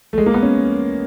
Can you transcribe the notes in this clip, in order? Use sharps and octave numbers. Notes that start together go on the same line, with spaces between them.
A3
G#3
A#3
B3
C#4